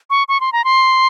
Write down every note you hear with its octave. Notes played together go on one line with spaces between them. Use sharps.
C#6
C#6
C6
A#5
C6